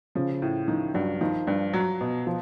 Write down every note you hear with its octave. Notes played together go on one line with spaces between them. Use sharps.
C#3 F3
A2
D#3 F3
G2 F#3
D#3 F3
G2
F#3
B2
F3